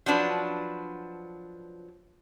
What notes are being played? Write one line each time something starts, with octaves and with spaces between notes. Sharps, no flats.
F3 F#3 D4 B4